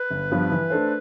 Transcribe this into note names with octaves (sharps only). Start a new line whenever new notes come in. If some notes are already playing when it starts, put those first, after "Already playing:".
Already playing: B4
G1
G2 F3 B3
E3
A3 D4 A4 C5